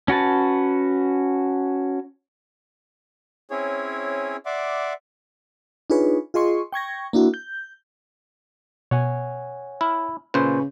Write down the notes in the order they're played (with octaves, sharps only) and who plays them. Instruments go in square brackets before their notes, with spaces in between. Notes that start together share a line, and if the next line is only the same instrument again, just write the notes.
[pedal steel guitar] C#4 F#4 B4 A5
[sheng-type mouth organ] C4 C#4 E4 G#4 C#5
D5 E5 F#5 C6 D6
[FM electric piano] D4 D#4 F4 G#4 B4 C#5
F4 G#4 D#5 C6 C#6
G5 C#6 G#6 A#6
A#3 D4 E4 F#4
G6
[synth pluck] B2 [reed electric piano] C#5 F#5 G#5
[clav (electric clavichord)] E4 [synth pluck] F6
[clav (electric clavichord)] A#2 C5 [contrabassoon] C#3 [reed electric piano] B4 G#5 C#6